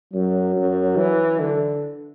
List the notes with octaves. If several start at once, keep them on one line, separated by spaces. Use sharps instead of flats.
F#2 F#3
F#2
E3
D3